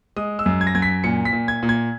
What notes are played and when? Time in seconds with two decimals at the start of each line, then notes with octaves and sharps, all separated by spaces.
0.16 G#3 D#6
0.39 E6
0.46 F#2
0.61 G#6
0.67 A#6
0.75 F#2 G#6
0.82 B6
1.04 A#2 C#7
1.25 B6
1.33 A#2
1.48 G#6
1.63 A#2
1.69 G#6